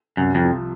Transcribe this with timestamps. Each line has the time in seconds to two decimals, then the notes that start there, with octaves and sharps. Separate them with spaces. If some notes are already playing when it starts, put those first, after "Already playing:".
0.17 C2 F#2
0.35 F2
0.43 C3 F3